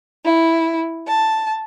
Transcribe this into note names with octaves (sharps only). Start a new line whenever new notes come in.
E4
A5